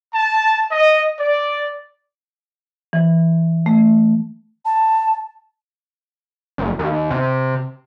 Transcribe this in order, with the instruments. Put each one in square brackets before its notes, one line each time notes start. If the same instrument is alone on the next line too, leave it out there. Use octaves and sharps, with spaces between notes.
[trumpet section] A5
D#5
D5
[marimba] E3
A3
[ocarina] A5
[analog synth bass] F#1
D#2
C3